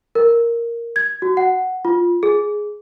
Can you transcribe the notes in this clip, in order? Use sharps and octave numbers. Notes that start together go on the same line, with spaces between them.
A#4
G#6
F#4
F#5
F4
G#4